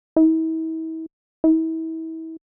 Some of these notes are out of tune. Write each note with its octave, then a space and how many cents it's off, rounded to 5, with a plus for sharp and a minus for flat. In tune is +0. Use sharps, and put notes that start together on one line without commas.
E4 -40
E4 -35